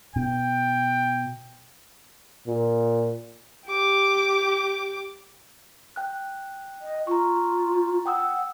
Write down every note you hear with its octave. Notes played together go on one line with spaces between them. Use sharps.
B2 G5
A#2
G4 D6
G5 F#6
D#5
F4 A#5 C#6
F#5 G5 D#6 E6